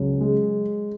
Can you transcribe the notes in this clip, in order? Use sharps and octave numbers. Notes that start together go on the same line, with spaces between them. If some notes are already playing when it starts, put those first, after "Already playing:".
Already playing: C#2 F#3
G#3